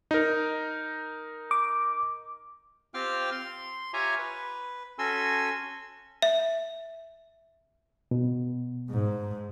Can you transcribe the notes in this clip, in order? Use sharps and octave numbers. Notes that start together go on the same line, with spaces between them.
D#4 A#4
D6
C4 F4 G4 F5 G5 F6
C6
F4 G4 C#5 E5 G#5 A#5
B4
C#4 F#4 A4 G#5 C6 E6
E5
B2
G#2